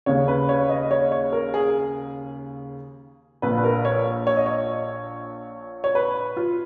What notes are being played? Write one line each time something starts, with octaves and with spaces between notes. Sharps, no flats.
D#2 C#3 C#5
B4
C#5
D#5
C#5
C#5
A#4
G#4
A#1 A#2 B4
B4
A#4
C#5
C#5
D#5
C#5
C#5
B4
F4